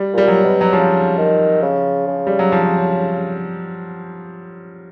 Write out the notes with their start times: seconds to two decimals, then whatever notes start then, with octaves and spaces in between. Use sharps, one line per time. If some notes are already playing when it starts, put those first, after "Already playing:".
Already playing: G3
0.13 A#2 G3
0.28 F#3
0.43 B2
0.61 F#3
0.73 C#3 F3
1.18 D#3
1.62 C#3
2.07 C#3
2.27 G3
2.39 F#3
2.52 F3